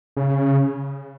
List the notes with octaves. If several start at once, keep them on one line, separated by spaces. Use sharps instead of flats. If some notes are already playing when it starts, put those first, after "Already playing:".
C#3